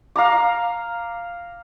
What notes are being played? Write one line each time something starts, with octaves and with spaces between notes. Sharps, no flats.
F5 A#5 D6